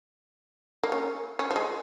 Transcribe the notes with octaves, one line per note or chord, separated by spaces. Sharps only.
A#3
C#4
C#4
F3
G#3